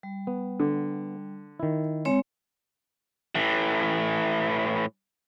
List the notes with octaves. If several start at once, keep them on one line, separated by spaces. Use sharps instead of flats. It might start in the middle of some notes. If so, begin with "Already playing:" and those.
G3
B3
D3
D#3 E4
G#3 C4 C#5
A2 E3